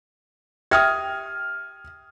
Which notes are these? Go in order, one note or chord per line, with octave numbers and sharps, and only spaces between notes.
G4 E5 G5 D#6 F6 G#6